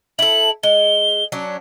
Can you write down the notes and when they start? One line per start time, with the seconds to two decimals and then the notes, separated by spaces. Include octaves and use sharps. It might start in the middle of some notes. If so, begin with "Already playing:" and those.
0.19 E4 A4 F#7
0.63 G#3 G7
1.32 F#3 C#4 D4